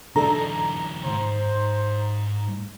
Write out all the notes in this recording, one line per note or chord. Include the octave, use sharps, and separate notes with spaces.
D#3 F3 D4 A4 A#5
C#2 G#2 C5